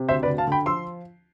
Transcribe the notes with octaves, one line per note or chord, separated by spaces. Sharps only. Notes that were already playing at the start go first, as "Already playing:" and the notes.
Already playing: C3
D2 C5 E5
B4 D5
D2
F5 A5
D3 G5 B5
F3 C6 E6